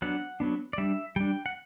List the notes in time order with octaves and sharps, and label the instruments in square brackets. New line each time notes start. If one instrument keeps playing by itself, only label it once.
[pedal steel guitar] F#3 B3 D4 F#5
F#3 B3 D4
D5
G3 D4 E5
G3 D4 G5
F#5